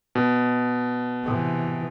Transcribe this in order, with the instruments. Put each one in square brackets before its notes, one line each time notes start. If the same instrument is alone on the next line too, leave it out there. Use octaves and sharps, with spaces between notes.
[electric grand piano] B2
[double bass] C3 E3